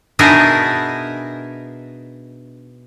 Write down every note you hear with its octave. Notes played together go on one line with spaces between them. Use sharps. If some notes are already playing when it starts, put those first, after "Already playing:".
B2 D4 D#4 G#4 A#4 E5